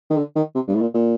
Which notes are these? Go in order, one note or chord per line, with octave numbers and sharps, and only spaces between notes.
D#3
D3
D#3
C3
G2
A2
A#2
A#2